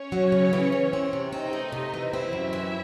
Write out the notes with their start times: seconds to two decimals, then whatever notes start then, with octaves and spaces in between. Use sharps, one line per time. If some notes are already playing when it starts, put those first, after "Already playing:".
Already playing: C#4 C#5
0.12 F#3
0.32 C#3
0.53 E3
0.72 E3
0.93 C4
1.13 C3
1.33 C4 D#4 D#5
1.53 A3
1.72 C3
1.94 E3
2.13 C4 E4 E5
2.33 F#2
2.53 E3